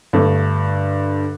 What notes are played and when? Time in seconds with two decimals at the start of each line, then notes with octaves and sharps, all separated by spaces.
0.13 G2 D3 A3